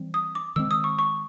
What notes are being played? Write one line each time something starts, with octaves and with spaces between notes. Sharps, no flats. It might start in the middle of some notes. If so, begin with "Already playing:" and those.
Already playing: E3 G3 C4
D#6
D6
D#3 G#3 C4 E6
D#6
C#6
C#6